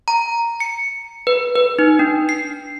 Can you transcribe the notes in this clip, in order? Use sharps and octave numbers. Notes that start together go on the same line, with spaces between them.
A#5
C#7
B4
B4
D#4
D4
C7